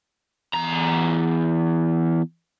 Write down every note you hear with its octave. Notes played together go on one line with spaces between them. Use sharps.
E2 A#5